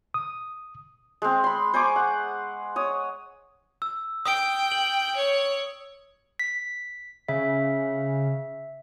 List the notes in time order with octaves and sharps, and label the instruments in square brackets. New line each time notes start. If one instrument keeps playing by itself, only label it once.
[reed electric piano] D#6
[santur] G#3 C4
B5 C6
C5 G#5 C#6 D6
F#5
C#5 D#6
[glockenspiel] E6
[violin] G5 [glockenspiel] D#6 D7
[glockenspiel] F#7
[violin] C#5
[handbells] B6
[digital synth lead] C#3 [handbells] E5